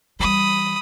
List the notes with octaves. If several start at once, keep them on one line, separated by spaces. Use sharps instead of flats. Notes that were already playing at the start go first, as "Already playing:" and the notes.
E3 G3 B5 D#6